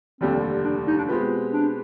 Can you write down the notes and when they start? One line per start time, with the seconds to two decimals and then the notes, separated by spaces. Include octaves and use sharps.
0.21 F1 D#2 D3 G3 C4
0.64 D4
0.87 D#4
0.97 D4
1.08 B2 G#3 C4 F4 G4 B4
1.53 D4